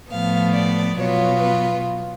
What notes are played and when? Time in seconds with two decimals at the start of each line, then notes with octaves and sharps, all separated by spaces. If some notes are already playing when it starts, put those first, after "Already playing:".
0.10 A2 F3 B3 F5
0.54 D5
0.97 B2 F#3 B3 F4 C#5
1.39 B4